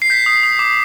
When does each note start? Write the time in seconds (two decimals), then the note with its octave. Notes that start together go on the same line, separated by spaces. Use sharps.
0.02 C7
0.10 G6 B6
0.26 D#6
0.43 D#6
0.59 D6